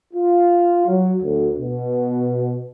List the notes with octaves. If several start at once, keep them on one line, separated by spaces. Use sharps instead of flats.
F4
F#3
D2
B2